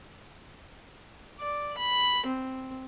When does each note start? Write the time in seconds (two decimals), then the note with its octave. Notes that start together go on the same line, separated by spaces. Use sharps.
1.40 D5
1.78 B5
2.26 C4